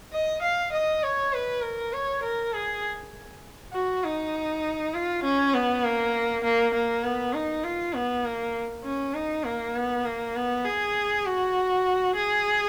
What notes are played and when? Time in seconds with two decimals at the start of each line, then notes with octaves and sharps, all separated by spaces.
0.13 D#5
0.42 F5
0.72 D#5
1.03 C#5
1.33 B4
1.62 A#4
1.93 C#5
2.23 A#4
2.53 G#4
3.73 F#4
4.04 D#4
4.94 F4
5.24 C#4
5.54 B3
5.84 A#3
6.44 A#3
6.74 A#3
7.04 B3
7.34 D#4
7.64 F4
7.94 B3
8.25 A#3
8.84 C#4
9.14 D#4
9.44 A#3
9.75 B3
10.05 A#3
10.35 B3
10.64 G#4
11.26 F#4
12.15 G#4